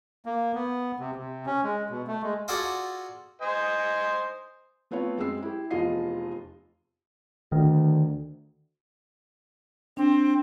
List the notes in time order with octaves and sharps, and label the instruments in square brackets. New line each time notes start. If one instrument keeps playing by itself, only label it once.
[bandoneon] A#3
B3
C3
C3
C#4
G#3
B2
A3
G#3
[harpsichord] F4 F#4 G#4 A4 D5 F#5
[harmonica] C5 D#5 G#5
[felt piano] A3 B3 C4 F4 C#5
F#2 G#3 C4 E6 C7
E4 G4
F1 E2 F3 F4 D#5 C7
[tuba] D2 [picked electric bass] D#3
[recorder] C4 [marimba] D4